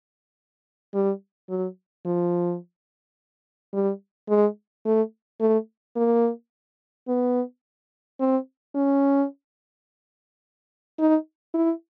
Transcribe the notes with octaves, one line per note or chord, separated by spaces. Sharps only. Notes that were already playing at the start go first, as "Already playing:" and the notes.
G3
F#3
F3
G3
G#3
A3
A3
A#3
B3
C4
C#4
D#4
E4